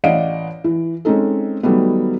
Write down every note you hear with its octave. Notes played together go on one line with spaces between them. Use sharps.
A1 D5 D#5 F5 F#5 D7
E3
G#3 C4 C#4 D#4 A4
D#3 F#3 G3 A3 B3